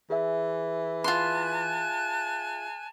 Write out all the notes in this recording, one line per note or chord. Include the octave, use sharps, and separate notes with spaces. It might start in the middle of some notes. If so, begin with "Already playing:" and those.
E3 G#4 E5
F4 G#5 A5 C6 F#6